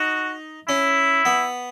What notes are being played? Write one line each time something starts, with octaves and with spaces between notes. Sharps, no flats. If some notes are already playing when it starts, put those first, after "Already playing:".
Already playing: D#4 F#4
C#4 E4
B3